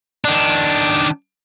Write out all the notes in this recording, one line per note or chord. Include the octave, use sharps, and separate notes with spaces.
D#3 D4